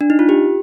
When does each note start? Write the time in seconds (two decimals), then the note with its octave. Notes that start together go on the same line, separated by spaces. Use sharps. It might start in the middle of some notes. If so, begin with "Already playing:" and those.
0.01 D4
0.10 D#4
0.19 F4
0.29 G4